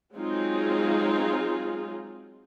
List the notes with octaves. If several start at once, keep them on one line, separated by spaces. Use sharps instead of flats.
F#3 G#3 C4 D#4 F4 G#4